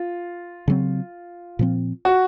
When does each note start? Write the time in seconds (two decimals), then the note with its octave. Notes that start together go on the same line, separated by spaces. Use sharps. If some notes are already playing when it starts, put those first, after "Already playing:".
Already playing: F4
0.68 C#3 F#3 C4
1.59 A#2 F3 C4
2.05 F#4